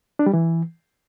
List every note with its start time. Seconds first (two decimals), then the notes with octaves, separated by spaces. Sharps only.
0.19 D4
0.26 G3
0.33 E3